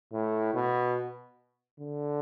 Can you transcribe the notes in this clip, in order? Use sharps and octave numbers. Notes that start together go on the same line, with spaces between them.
A2
B2
D3